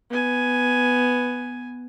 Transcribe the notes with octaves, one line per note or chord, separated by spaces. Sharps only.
B3 G#5